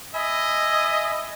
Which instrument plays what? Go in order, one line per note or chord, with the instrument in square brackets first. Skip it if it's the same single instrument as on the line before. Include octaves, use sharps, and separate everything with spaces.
[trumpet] D#5 [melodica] E5 G#5 B5